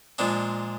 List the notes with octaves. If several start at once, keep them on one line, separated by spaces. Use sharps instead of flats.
A#2 F3 G#3 D4